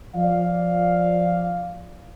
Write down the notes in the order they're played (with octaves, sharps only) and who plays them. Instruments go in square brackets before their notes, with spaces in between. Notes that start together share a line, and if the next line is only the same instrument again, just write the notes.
[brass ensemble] F3 D5 F5